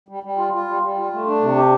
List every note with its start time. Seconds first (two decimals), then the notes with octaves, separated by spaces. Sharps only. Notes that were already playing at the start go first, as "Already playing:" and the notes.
0.09 G3
0.23 G3
0.38 F4
0.53 F4
0.68 G3
0.82 G3
0.98 F4
1.13 A3
1.27 D4
1.41 C3
1.56 G4